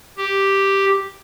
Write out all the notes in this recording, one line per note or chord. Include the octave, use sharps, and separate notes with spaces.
G4